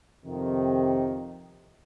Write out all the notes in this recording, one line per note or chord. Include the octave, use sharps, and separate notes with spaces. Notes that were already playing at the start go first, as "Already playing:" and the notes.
F2 C3 D#3